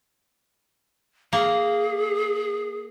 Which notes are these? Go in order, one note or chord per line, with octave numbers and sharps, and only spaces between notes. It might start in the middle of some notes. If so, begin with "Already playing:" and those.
A#3 G#4